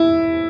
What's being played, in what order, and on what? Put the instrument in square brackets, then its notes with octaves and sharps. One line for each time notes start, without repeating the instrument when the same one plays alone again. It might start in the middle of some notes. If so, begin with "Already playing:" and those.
Already playing: [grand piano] E4